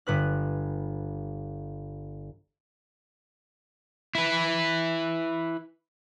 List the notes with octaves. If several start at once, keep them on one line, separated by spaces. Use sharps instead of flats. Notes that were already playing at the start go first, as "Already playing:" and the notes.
G1 B4 F#6
E4 B4